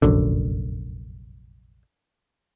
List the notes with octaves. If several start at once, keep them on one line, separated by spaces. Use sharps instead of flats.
F1 A#1 F#2 D3